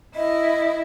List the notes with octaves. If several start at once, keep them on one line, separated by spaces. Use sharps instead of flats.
E4 D#5